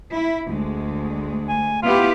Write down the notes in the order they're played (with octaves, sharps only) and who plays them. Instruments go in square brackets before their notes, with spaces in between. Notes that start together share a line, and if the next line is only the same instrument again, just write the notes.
[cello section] E4
D2 G#3
[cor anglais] G#5
[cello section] B3 E4 G4 [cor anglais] F4